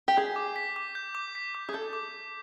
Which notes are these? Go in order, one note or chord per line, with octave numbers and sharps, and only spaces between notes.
G4
G#4 G6
D6
B6
D6
G6
D6
B6
D6
G#4
A4 G6
D6